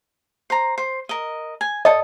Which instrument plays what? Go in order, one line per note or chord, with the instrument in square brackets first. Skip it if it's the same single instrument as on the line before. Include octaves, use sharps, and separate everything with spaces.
[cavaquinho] C5 A#5
C5
A#4 D#5
G#5
[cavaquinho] A4 D#6 [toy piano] D5 D#5